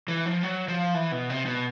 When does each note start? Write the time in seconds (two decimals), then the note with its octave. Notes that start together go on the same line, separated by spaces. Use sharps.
0.08 E3
0.26 F3
0.43 F#3
0.68 F3
0.94 E3
1.12 B2
1.30 C3
1.46 B2